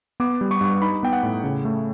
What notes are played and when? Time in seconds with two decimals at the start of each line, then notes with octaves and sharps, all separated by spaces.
0.20 B3 D6
0.41 G3
0.51 C#6
0.61 G2
0.81 D#4 B5
1.03 B3 G5
1.13 F#5
1.23 A2
1.44 C#3
1.65 A3